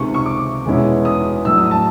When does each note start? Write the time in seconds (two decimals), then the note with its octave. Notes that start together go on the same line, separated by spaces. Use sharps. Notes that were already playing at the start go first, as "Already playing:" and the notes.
Already playing: C#2 C3 D#3 C#6
0.14 C#6
0.26 D6
0.65 E2 B2 G#3 C#4 E4
1.05 D#6
1.45 A2 F#3 A3 D4 E6
1.58 D#6
1.71 A5